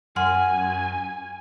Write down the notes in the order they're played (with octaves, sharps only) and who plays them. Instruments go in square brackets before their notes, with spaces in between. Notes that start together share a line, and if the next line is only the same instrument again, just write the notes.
[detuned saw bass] F#2 [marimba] F#5 C6 F6 [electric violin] G#5